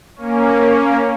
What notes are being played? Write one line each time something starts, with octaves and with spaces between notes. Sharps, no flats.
A#3 C#4